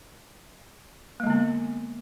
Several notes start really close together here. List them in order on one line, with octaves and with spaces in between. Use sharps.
A#3 G#3 D3 B3